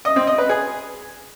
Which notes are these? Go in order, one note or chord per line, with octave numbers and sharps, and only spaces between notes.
D#5
C4
D#5
B4
G#4